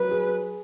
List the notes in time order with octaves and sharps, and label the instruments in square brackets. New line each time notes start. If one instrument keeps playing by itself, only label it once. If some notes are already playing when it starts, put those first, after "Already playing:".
Already playing: [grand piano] F#3 [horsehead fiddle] B4
[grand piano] G#4